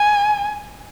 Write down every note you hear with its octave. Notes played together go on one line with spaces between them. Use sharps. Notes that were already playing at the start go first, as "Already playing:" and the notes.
Already playing: G#5